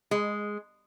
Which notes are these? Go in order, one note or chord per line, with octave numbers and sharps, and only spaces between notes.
G#3